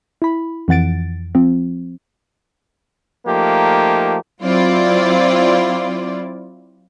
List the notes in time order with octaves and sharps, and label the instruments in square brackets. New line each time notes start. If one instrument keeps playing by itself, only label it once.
[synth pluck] E4 B5
F2 E3 F#5 A6 D7
F3 C4
[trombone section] F3 A3 A#3 D#4 G4
[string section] F#3 C4 E4 F4 D5